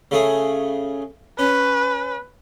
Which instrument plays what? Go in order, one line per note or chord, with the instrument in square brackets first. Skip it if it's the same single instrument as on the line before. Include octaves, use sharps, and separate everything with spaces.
[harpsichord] C#3 A3 G#4
[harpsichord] C#4 [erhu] B4